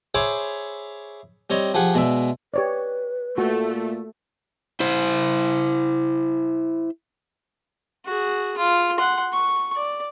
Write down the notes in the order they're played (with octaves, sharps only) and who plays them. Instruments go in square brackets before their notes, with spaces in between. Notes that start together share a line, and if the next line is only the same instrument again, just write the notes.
[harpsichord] G#4 C5 C#5 E5 B5 D6
G3 C4 C#5 D#5
F3 G4 G#4 F#5
B2 G#3 D5 E5
[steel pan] G4 C#5 D5 [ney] B4
[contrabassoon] A#2 [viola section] A3 [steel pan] F#4
[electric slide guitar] E4 C5
[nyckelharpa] F#4 G#4
F4
F#5 C6
C#6
D5